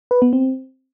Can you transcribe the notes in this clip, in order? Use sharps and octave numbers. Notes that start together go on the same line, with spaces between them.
B4
B3
C4